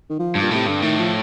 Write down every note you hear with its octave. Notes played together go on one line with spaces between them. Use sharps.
D#3
F3
G2
A#2
A2 C3
G2 D3
A2 D#3
F3